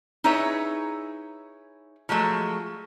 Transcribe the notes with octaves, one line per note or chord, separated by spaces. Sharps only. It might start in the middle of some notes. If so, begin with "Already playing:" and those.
D#4 E4 G#4 B4 C#5 E5
F3 F#3 G#3 A3